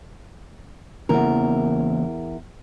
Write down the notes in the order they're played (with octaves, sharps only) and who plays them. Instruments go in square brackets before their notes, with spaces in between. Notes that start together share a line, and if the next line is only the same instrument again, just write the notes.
[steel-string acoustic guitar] E2 A#4 [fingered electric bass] C#3 E3 A#3